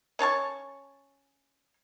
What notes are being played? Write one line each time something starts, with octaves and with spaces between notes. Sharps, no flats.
C#4 C#5 A5 C#6